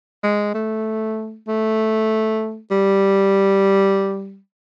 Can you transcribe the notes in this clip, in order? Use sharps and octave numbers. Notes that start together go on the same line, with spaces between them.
G#3
A3
A3
G3